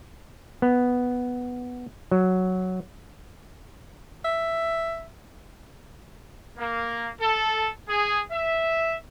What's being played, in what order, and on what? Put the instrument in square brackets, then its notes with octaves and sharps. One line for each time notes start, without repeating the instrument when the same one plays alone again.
[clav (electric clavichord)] B3
F#3
[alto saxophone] E5
[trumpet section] A#3
A4
G#4
E5